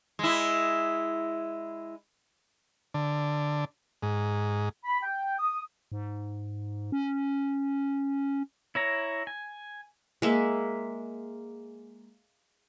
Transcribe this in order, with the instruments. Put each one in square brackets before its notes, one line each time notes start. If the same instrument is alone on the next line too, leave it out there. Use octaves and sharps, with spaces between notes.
[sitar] G#3 E4
[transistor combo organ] D3
G#2
[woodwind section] B5
G5
D#6
[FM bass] G#2
C#4
[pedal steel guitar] E4 C#5 A#5
G#5
[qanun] G#3 A#3 E5